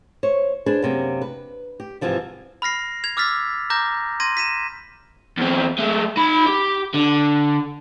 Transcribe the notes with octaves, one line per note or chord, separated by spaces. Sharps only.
C5 C#5
D4 G#4 B4 C5
F#2 C3 A#3
B4
G4
G#2 C3 E3 F3 G3
B5 F6 A#6 C7
G#6 F7
D6 E6 F6 A6 B6
A#5 D6 F6 G6 A#6
C6 G#6 A#6 D#7
B6 D#7 E7
E2 C4
G#3 A3
D#4 B5
G4
D3